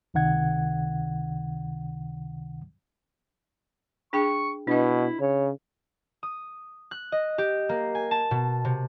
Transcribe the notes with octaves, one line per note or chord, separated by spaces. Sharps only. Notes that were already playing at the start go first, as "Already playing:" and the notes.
C#2 C3 D#3 F#5 G#6
D4 G#4 G5 C#6
B2 D4 E4 B4 D#5
C#3 C#5
D#6
F#6
D#5
G4
A#3
G#5
A5
B2
C3